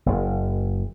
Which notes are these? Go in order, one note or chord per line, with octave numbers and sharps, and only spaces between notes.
F#1